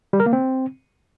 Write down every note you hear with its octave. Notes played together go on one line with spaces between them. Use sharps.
G3
A#4
A#3
C4